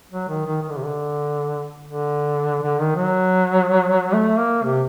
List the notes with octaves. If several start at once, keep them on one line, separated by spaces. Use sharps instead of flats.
F#3
D#3
D#3
D#3
D3
C3
D3
D3
D3
D#3
F#3
A3
A#3
C3